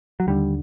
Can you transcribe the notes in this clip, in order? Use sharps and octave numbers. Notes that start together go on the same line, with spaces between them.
F#3
D#2 D3 G3